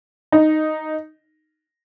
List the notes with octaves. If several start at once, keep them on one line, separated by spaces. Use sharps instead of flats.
D#4